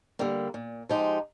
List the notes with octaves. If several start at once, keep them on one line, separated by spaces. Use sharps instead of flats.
D3 G3 A#3
A#2
F3 G#3 D#4 G4